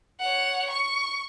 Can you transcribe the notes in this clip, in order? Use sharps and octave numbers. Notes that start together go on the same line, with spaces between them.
C#5 F#5
C#6